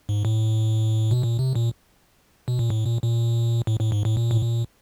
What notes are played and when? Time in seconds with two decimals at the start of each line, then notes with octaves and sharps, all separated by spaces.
0.09 G#2
0.25 A2
1.11 B2
1.23 A#2
1.39 C3
1.55 A#2
2.48 B2
2.59 A#2
2.70 A2
2.86 A#2
3.02 A#2
3.67 A2
3.80 A2
3.92 G#2
4.05 A2
4.17 A#2
4.31 A2
4.42 A#2